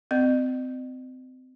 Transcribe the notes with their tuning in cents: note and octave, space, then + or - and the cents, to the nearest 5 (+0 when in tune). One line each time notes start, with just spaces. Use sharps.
C4 -30 D#5 -45